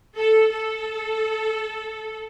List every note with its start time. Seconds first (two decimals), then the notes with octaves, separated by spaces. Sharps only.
0.17 A4
0.50 A4